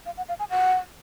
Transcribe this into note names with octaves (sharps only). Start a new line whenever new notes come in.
F5
F#5
F5
G#5
F#5